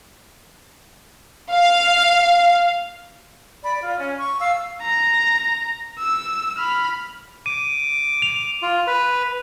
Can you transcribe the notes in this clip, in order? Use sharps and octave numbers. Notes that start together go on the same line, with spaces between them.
F5
D5 B5
F4
C#4
C#6
F5 E6
A#5
E6
B5 F6
D6 D#7
F7
F4
B4